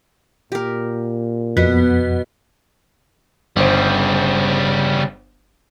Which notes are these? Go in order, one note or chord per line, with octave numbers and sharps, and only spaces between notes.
A#2 G4 A#4
F2 B2 B3
G1 C#3 G3 C5